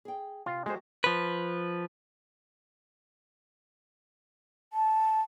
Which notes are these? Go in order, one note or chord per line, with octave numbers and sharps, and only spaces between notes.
G#4 G5
C3 F4
G#3 A3 F#4 G4 C5
F3 B4
A5